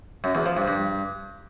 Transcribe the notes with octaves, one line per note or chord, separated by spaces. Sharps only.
F#2
E2
F3
G2
G2